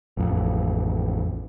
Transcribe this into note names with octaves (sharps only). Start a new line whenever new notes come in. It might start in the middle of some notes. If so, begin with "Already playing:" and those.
A1 F2